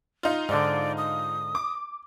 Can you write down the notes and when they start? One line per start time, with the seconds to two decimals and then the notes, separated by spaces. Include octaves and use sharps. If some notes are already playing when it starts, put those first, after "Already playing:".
0.23 D#4 F4
0.49 G#2 D3 D5
0.98 D#6
1.55 D6